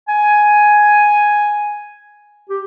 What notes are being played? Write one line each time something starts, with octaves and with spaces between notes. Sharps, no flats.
G#5
G4